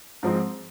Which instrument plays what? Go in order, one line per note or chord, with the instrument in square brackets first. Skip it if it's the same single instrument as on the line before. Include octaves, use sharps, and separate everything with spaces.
[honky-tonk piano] G#2 F3 G#3 C4